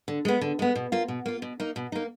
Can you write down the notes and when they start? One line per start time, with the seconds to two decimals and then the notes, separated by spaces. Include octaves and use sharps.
0.08 D3
0.25 G#3 B3
0.41 D3
0.59 G#3 B3
0.75 B2
0.92 A#3 F4
1.08 B2
1.26 A#3 F4
1.42 B2
1.60 A#3 D#4
1.76 B2
1.92 A#3 D#4